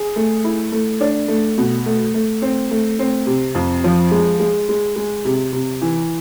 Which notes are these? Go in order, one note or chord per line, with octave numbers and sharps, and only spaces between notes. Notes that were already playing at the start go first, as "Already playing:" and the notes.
Already playing: G#4
A3
E4
A3
D4
A3
B2
A3
A3
C4
A3
C4
C3
F2
F3
G#3
G#3
G#3
G#3
C3
C3
E3